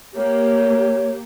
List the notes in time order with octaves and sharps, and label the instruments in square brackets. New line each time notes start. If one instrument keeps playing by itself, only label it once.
[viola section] A#3 G4 [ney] C#5